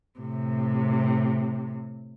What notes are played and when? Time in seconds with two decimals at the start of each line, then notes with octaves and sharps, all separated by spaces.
0.20 A2 C3